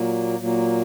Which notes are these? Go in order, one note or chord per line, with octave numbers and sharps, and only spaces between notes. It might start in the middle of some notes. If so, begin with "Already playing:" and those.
Already playing: A#2 F#3 A#3
A#2 F#3 A#3